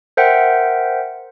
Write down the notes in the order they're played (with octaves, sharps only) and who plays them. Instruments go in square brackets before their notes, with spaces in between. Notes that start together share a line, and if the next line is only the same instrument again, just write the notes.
[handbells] A#4 C5 E5 F#5 G5